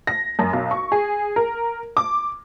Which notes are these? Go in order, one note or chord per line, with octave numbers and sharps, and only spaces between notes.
A#6
F#2
B1
C#6
G#4
A#4
D6